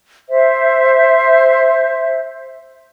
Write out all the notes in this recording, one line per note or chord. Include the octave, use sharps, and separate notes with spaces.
C5 E5